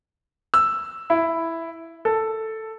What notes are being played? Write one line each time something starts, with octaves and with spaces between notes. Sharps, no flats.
E6
E4
A4